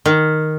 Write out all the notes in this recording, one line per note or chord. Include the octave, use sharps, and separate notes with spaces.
D#3